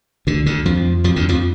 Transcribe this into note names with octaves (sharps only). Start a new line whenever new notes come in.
D2 D3
D2 D3
F2 F3
F2 F3
D2 D3
F2 F3